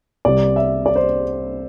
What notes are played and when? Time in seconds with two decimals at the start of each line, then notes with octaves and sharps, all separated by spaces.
0.25 C2 C3 G3 D5
0.56 E5
0.86 D5
0.96 C5